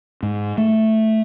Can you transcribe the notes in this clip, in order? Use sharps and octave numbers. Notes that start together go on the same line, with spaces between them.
G#2
A3